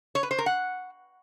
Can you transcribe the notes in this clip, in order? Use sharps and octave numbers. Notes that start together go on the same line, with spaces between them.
C#5
B4
C5
A#4
F#5